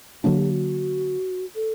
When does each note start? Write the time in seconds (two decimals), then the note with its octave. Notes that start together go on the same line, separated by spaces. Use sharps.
0.24 D3 F#3 A#3 D4 F#4
0.37 G4
0.51 F#4
1.56 A4